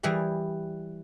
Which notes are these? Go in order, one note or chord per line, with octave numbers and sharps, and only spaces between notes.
E3 G3 E4 G#4 D5